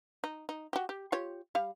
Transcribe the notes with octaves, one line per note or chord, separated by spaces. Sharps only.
D#4
D#4
F#4 G4
G4
F4 G4 C#5
G3 F5